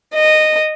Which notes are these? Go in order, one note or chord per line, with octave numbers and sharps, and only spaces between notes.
D#5